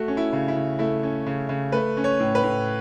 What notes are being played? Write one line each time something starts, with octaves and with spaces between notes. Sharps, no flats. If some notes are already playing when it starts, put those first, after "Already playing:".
Already playing: A3 F#4
C#4
E4
C#3
E4
C#3
A3 E4
C#4
C#3
C#3
A3 B4
C#4
C#5
A2
B4
A2